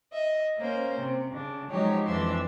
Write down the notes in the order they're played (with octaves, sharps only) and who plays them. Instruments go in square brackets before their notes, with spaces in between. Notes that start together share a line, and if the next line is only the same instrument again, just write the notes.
[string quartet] D#5 E5
A#3 C#4 C5
C3
C#3 D4
F3 F#3 G#3 D#4 G4 C#5
F2 E3 D4 E5 C6